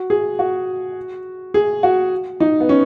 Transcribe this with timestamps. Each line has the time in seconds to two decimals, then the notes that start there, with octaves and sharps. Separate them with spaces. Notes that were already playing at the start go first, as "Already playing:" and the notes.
Already playing: F#4
0.10 G#4
0.39 F#4
1.54 G#4
1.83 F#4
2.40 D#4
2.60 B3
2.69 C#4